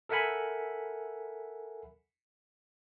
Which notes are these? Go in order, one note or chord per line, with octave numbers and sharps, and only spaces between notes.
A4 A#4 E5 F#5 G#5 B5